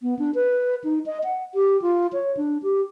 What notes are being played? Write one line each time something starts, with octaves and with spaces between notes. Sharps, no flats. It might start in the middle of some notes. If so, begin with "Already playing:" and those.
B3
D4
B4
D#4
D#5
F#5
G4
F4
C#5
D4
G4